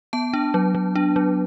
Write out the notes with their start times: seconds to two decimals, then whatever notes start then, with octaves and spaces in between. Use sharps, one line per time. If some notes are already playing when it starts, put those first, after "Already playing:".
0.13 B3 A5
0.34 D4
0.54 F#3
0.75 F#3
0.96 D4
1.16 F#3